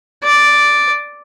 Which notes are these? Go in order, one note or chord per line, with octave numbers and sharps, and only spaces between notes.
D5